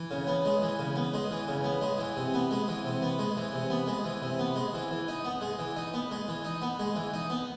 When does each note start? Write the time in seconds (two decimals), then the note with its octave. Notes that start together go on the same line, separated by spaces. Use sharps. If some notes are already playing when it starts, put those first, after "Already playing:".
Already playing: E3
0.11 C#3
0.27 B3
0.45 G#3
0.62 E3
0.79 C#3
0.96 B3
1.14 G#3
1.31 E3
1.48 C#3
1.64 B3
1.81 G#3
1.98 E3
2.16 C3
2.34 B3
2.51 G#3
2.68 E3
2.85 C3
3.02 B3
3.19 G#3
3.37 E3
3.53 C3
3.70 B3
3.87 G#3
4.04 E3
4.22 C3
4.39 B3
4.56 G#3
4.74 E3
4.91 E3
5.08 D#4
5.25 B3
5.41 G#3
5.59 E3
5.76 D#4
5.94 B3
6.11 G#3
6.28 E3
6.45 D#4
6.62 B3
6.79 G#3
6.96 E3
7.14 D#4
7.30 B3